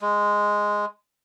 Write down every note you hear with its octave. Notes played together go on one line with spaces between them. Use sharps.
G#3